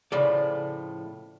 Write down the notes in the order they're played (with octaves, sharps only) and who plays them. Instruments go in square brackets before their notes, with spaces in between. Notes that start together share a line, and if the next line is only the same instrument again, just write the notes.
[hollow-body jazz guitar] A2 C#3 F3 A3 D5